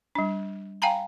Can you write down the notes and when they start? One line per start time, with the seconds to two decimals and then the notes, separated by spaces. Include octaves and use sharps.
0.15 G3 D4
0.82 F5 G5 G#5 A#5 B5